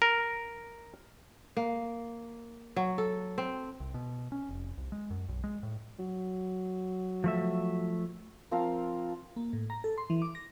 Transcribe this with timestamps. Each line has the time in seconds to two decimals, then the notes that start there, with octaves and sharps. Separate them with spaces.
0.02 A#4
1.57 A#3
2.76 F#3
2.98 A4
3.38 C4
3.80 C2
3.94 B2
4.32 C#4
4.49 F1
4.77 C2
4.92 G#3
5.10 F#2
5.29 B1
5.44 G#3
5.63 A2
5.99 F#3
7.24 F3 A3 E5
8.51 F3 C4 A#4 F5
9.36 A#3
9.53 A2
9.70 A#5
9.84 A4
9.98 C6
10.10 E3
10.22 D6
10.35 A#6